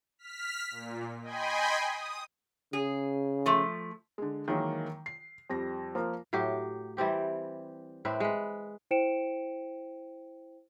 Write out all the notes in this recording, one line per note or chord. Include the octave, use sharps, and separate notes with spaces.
F6 B6
A#2
D#5 G5 G#5 B5 C6
D#6
C#3 G#4
F3 A3
D3 G#3
D#3 E3 F#3 G#3 A#3 D#4
C7
F2 G3 A#6
F3 A#3
A2 F#3 G4
E3 G3 C4 G4
A2 A3 C4 B4
G#3 B4
E4 C5 G5 C#7 D7 E7